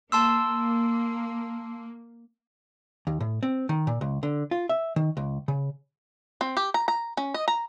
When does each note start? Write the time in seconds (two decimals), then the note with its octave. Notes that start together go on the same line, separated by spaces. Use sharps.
0.12 A#3 A5 C6 E6
3.07 D#2
3.21 A2
3.43 C4
3.69 D#3
3.87 A#2
4.01 C#2
4.23 D3
4.51 F4
4.69 E5
4.96 D#3
5.17 C#2
5.48 C#3
6.41 C4
6.57 G4
6.74 A#5
6.88 A#5
7.17 C#4
7.34 D#5
7.48 A#5